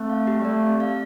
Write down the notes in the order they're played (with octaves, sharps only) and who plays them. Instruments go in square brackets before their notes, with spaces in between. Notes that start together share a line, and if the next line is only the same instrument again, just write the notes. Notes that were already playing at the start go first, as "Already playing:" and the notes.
Already playing: [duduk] A3 [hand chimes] C4
[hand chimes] F5
G4
[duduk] G3
[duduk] A3 [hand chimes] D5
[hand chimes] C4
F5